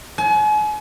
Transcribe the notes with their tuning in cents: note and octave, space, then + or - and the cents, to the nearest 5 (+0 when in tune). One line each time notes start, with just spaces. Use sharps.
G#5 +40